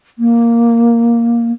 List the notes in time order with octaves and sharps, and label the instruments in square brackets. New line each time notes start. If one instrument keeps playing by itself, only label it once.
[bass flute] A#3